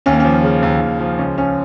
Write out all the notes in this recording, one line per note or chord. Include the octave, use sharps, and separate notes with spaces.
D#2 C#4
A#3
F3 C#4
C#3
D#2
D#2
F3
C#2 C#4
F3 C#4